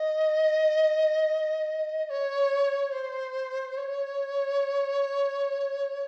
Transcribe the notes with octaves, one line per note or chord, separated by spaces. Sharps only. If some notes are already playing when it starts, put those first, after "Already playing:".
Already playing: D#5
D#5
C#5
C5
C#5